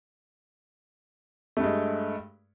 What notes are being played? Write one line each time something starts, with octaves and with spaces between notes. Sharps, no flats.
G2 G#3 A3